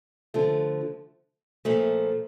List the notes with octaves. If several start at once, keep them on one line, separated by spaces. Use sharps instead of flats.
D3 F3 A3
A#2 F3 A3